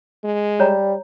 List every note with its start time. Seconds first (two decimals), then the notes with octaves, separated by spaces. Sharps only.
0.24 G#3
0.60 G3 C#5 A#5